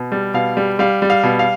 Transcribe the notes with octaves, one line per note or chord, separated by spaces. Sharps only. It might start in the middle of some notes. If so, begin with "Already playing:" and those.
Already playing: B2
G3
B2 F5
G3
G3 F5
G3
F5
B2
F5